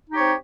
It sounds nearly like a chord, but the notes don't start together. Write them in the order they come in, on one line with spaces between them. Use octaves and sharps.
D#4 G4 C#5 C4